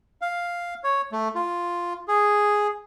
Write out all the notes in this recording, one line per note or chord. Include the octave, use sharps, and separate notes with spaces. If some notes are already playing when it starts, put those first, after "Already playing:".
F5
C#5
A3
F4
G#4